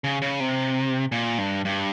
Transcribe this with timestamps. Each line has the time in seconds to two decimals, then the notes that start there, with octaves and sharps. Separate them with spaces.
0.04 C#3
0.22 C#3
0.40 C3
1.12 A#2
1.38 G2
1.65 G2